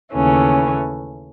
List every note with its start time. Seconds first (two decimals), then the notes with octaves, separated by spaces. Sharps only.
0.14 D#2 C#3 E3 A3 C#4